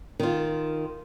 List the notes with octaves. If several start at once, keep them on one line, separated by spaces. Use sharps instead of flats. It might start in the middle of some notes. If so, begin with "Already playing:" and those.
D#3 F4